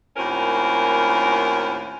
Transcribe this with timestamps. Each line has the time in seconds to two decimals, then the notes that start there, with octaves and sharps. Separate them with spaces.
0.16 D#2 A2 C4 C#4 F4 A#4